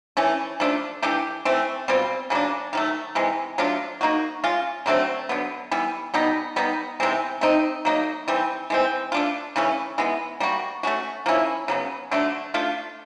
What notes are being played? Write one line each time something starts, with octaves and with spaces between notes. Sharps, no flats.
E3 A3 C#4
F3 A3 D4 F4
E3 A3 D4 G4
E3 A3 C4
B2 G3 C4 F4
C#3 F#3 A#3 D4
D#3 F#3 A3
C3 E3 G#3
F#3 A3 D4 F4
A#3 D#4 F#4
G#3 C#4 F4
D3 F#3 A3 C4
D3 F#3 B3
E3 G3 B3
B2 G3 B3 D#4
G3 B3 D#4
C3 E3 G#3 C4
A3 C4 D#4
F#3 A#3 D#4
E3 G3 C4
E3 G#3 C4
A3 D4 F4
C#3 E3 A3 C#4
E3 G#3 B3
G3 A#3 D4 F#4
A3 C#4 F#4
F3 A#3 C#4 E4
C#3 F#3 B3
D3 F#3 A3 D4
A3 D4 F4